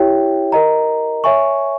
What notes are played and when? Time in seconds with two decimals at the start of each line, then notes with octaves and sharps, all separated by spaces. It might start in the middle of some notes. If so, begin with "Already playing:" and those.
Already playing: E4 G4 C#5 E5 G5
0.52 A#4 D#5 A#5
1.24 C#5 E5 G#5 C#6